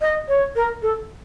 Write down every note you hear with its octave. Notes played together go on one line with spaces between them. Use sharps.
D#5
C#5
A#4
A4